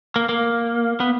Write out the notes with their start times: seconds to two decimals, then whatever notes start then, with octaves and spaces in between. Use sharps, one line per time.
0.16 A#3
0.29 A#3
1.00 B3